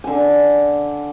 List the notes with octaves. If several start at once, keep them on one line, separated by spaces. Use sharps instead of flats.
D3 G#5